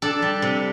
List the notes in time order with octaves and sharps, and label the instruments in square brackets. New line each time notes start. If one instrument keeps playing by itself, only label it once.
[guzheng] D4 A4
G3
C3